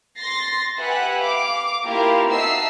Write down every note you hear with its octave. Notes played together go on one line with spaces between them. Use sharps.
C6 A6 A#6 C7
G4 B4 E5 F#5 G#5
F5 D6
A#3 E4 F4 G4 A#4 F5
D#4 F#4 E5 A5 E6 C7